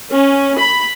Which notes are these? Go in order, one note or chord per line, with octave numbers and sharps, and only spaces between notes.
C#4
B5